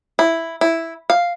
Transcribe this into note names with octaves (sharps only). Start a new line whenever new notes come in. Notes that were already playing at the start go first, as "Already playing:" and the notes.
E4
E4
F5